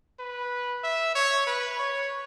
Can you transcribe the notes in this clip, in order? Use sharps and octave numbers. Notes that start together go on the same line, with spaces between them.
B4
E5
C#5
B4
C#5